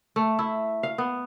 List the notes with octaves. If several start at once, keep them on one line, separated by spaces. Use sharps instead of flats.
A3
E4
F5
B3